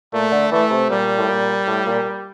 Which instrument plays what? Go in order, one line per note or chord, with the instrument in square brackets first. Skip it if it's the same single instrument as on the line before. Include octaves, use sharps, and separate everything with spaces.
[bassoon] A#2 [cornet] A3
[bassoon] D3
[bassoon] E3 [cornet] A3
[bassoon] C3
[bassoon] A#2 [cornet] G3
[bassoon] A2
A#2
A2
A#2